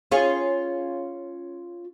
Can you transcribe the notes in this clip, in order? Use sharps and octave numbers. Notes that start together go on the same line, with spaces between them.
C#4 F4 G#4